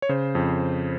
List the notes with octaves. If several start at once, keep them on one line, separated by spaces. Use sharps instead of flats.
C#5
C#3 C5
F2